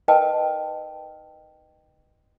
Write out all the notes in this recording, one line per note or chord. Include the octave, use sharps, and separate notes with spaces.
D#4 A#4 B4 D#5 G5 A5